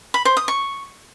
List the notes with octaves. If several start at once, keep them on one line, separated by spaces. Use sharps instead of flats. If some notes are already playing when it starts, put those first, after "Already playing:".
B5
C5
D#6
C#6